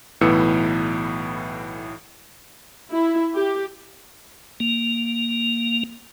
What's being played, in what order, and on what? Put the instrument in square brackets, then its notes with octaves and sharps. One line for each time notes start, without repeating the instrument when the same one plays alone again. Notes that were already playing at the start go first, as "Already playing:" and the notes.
[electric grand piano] B1 A2 E3 B3 E6 C#7
[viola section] E4
G4
[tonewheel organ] A#3